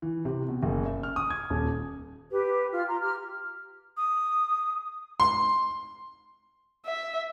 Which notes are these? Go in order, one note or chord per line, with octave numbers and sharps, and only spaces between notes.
E3
C3
B2
F#1
E5
F6
D#6
G#6
D#1
G4 B4
F4 F6
A#5 C6
G4 F6
D#6
C6
E5